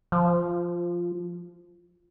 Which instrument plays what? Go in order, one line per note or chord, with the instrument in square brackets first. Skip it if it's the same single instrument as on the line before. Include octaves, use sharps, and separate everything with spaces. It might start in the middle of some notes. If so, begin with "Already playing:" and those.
[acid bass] F3